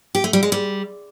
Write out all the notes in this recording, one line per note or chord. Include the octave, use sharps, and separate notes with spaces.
G4
A3
G3
G#3
G3